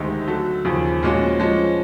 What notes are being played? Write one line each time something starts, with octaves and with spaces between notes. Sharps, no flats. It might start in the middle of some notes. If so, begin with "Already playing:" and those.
Already playing: D2 C3 D#3 G#3
D3 F#3 A3
D#2 C#3 F3
A#2 F3 G#3 C#4 F#4
F3 G#3 C#4